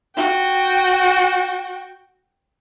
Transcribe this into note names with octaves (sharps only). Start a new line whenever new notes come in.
F#4 G5